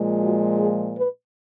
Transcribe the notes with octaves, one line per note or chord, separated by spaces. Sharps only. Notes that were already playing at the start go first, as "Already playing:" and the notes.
Already playing: A#2 F3 G#3
F#4
G#4
B4